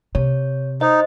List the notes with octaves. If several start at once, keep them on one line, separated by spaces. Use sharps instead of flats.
C3 C#5
D#4 C5 D#5